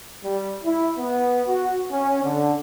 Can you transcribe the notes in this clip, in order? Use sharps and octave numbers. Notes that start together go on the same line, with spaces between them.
G3
E4
B3
F#4
C#4
D3